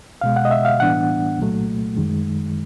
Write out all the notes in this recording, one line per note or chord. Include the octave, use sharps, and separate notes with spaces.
C#2 B2 G#3 F5
F#5
D#5
E5
F5
A2 E3 G3 B3 D4 F#5
C2 A#2 F#3 A3
F#2 D#3 G#3